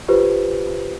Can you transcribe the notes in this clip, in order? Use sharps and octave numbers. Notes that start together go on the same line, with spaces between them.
F4 G4 B4 C5